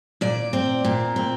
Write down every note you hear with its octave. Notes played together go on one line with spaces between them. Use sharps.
A#2 D5
C4
A#2
C4